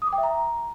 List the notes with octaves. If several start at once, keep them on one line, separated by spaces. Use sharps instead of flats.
D#6
D6
G5
E5
A#5